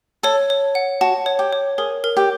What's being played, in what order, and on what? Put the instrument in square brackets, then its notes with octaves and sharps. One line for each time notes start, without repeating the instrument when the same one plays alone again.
[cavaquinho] A4 [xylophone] C#5
[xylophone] C#5
F#5
[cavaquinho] F#4 [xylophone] A5
[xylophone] C#5
[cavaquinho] G4
[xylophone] C#5
[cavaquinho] G#4 [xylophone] A#4
[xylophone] A#4
[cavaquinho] G4